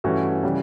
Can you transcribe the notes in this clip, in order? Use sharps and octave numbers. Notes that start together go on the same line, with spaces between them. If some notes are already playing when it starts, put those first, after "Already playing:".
G2 E3 A3 C#4 F#4
C#3 E3 G3